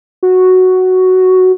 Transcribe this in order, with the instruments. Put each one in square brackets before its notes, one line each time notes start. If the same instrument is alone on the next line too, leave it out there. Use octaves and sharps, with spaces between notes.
[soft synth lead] F#4